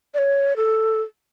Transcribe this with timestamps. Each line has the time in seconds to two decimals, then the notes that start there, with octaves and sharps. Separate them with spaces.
0.14 D5
0.18 C#5
0.56 A4